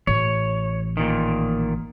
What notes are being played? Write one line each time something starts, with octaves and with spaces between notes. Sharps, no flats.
A1 C#5
A#2 D#3